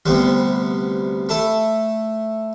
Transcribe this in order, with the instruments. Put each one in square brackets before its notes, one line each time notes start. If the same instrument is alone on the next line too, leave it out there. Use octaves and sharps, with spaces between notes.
[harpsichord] D2 C3 G3 B3
A3 E4 A4